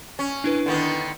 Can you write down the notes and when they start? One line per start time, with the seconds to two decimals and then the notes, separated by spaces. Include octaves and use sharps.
0.19 C#4
0.44 D4 E4 B4
0.66 D3 D#3 B3